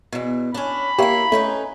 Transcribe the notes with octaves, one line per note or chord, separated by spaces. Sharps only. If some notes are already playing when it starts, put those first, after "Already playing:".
E2 B2
C#4 D4 B5
A#3 E4 G4 C#5 E5
A3 C#4 D#4 B4